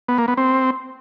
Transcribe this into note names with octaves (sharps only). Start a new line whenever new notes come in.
B3
A#3
B3
C4